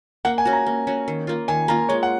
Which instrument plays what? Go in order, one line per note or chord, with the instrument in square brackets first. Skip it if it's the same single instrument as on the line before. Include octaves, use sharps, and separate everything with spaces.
[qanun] A#3 [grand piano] F#5
[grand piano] G#5
[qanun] C#4 F#4
[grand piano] A#5
[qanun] A#3
C#4 F#4
D#3
A#3 F4
[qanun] D#3 [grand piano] G#5
[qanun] A#3 F4 [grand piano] A#5
[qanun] G#3 [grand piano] C#5
[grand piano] F#5